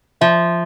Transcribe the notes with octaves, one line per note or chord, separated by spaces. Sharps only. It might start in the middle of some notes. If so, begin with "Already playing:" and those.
F3 E5